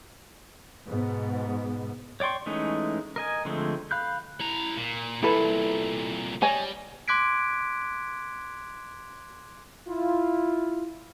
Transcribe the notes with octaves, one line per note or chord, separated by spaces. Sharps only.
G#2 B2 B3
C#5 D5 G5 C6 C#6
E3 G#3 A3 C#4 D#4
A#4 D#5 G#5
D3 F3 G#3 A3 C4
F5 B5 F#6 G6
E4 A#5
A#2
C2 A#2 E4 A4 B4
G3 C#5 D#5 G#5
C6 D6 F#6 G#6 B6 D7
E4 F4